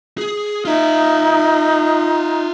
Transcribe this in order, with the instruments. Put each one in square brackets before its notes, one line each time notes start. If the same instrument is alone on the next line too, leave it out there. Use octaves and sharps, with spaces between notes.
[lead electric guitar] G#4
[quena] D#4 [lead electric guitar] F4 E5